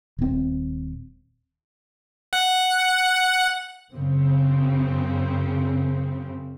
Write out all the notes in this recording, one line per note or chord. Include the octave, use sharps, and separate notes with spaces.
D#1 C4
F#5
F#2 C#3 C4